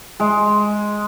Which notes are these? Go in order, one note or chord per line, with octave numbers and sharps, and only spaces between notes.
G#3